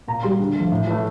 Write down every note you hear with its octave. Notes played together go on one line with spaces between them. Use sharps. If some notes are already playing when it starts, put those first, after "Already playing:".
A#2 A#5
G3 C6
D3
F3 A3
A2
E3 A3